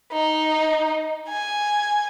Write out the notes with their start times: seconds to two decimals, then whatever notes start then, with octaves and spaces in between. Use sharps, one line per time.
0.12 D#4
1.29 G#5